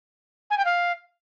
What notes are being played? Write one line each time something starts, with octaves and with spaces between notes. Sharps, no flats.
G#5
G5
F5